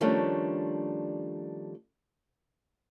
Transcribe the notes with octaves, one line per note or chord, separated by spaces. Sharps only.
D#3 F3 G3 A3 C#4 D4